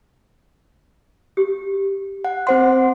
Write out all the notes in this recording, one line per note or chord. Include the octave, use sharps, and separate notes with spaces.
G4
F#5
C4 C5 F#5 C6